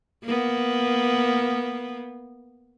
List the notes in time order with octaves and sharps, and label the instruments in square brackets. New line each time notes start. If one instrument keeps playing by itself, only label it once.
[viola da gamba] A#3 B3